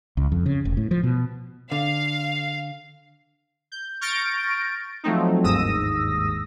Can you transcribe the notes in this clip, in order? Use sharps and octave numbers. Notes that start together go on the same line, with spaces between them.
C#2
F2
C#3
F1
A2
F3
B2
D3 F5
G6
C#6 F6 G6 A6 A#6 D7
F3 F#3 A3 C4 D#4
G1 D#2 G#2 D#6 E6 A#6